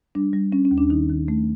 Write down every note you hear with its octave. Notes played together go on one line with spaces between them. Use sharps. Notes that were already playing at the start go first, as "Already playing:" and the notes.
G3 D4
G3
G3 C#4
C#4
D#2
D4
D#3 D#4
D#3
A3